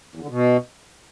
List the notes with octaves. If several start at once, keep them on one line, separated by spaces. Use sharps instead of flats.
E2
D3
B2